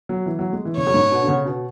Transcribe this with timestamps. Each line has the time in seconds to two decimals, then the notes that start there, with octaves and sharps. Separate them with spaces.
0.09 F#3
0.26 E3
0.39 F#3
0.53 G#3
0.65 E3
0.77 C#3 C#5
0.87 F#2
0.94 G#2
1.11 B2
1.22 D3
1.28 C#3
1.45 B2